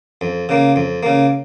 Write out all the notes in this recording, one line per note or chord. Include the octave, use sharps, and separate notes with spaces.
F2
C#3 A#3
F2
C#3 A#3